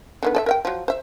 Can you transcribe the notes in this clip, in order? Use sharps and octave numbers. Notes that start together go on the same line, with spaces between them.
D3 D#3 B3
A4 D5 E5
A#4 E5 G5
F3 F#3
C5 E5